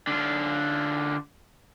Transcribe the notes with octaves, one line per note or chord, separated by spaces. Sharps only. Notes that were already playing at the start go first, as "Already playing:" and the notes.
D3 F4